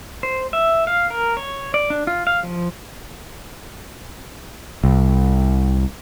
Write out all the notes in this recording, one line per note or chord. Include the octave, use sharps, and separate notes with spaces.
C5
E5
F5
A#4
C#5
D5
D4
F4
F5
F3
C2